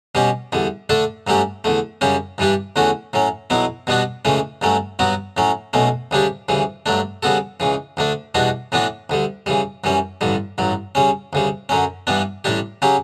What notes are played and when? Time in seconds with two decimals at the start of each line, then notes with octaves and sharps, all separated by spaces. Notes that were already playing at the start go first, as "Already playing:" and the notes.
0.15 B2 G3 C#4 G4
0.52 E2 D3 G3
0.89 D3 A3 D4 A4
1.27 G2 F#3 A3 C#4 G4
1.64 E2 D3 A3
2.01 F#2 C#3 G3 C#4 G4
2.38 G2 E3 G3 D4 G4
2.76 E2 D3 A3 C#4 F#4
3.13 A2 F#3 C#4
3.50 B1 B2 F#3 B3 E4
3.87 B2 G3 B3 D4 F#4
4.25 C#2 C#3 E3 A3 C#4
4.62 G2 F#3 A3 C#4
4.99 G2 F#3 B3 F#4
5.37 A2 F#3 C#4
5.73 B1 B2 A3 C#4
6.11 D2 C#3 G3 D4 G4
6.49 D2 C#3 E3 G3
6.86 G2 F#3 A3 D4
7.23 C#3 G3 B3 F#4 A4
7.60 C#2 C#3 E3
7.97 D2 D3 A3 D4
8.35 E2 B2 G3 D4 F#4
8.72 A2 E3 B3 D4 F#4
9.10 D2 D3 G3
9.46 C#3 E3 G3
9.84 F#2 E3 G3 C#4
10.21 A1 G2 D3 G3
10.58 A1 G2 F#3
10.95 C#3 G3 C#4
11.33 D2 C#3 G3
11.69 F#2 D3 F#3 C#4
12.07 G2 E3 G3 B3 D4
12.44 A1 A2 G3 D4 G4
12.82 C#3 F#3 C#4 G4